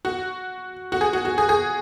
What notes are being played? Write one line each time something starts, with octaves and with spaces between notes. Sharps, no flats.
F#4
F#4
G#4
F#4
F#4
G#4
G#4